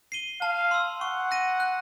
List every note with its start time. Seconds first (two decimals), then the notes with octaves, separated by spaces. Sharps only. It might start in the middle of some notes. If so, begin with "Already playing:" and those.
0.12 C7 D#7 G7
0.42 F5 A5
0.71 C6 E6
1.01 F#5 C#6
1.31 F#6 A#6 D#7
1.60 F#6